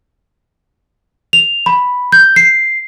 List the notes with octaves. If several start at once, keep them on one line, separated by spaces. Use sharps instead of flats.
F7
B5
G6
C7